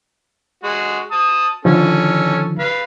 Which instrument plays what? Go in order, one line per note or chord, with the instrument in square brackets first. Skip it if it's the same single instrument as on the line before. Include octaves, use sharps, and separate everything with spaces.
[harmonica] G#3 F#4
A5 D#6
[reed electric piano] D3 D#3 F3 [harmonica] C#4 A4
[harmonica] B4 F5